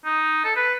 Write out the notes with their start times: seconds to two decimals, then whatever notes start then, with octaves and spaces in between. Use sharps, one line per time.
0.05 D#4
0.44 A4
0.56 B4